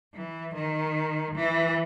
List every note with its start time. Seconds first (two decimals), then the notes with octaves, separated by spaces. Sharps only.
0.14 E3
0.55 D#3
1.36 E3